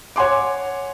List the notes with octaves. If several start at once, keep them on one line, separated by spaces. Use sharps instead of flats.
C#5 F#5 G#5 C6 D6